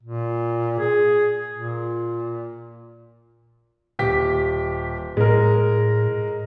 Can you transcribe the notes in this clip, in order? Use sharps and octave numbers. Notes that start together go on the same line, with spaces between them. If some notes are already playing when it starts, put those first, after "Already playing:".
A#2
G#4
A#2
D#1 G4 B6
A2 G#3 A#4